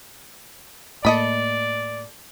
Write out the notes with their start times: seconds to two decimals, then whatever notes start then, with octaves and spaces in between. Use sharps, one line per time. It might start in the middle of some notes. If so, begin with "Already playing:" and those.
1.05 A2 A#3 A4 D5 D#5 B5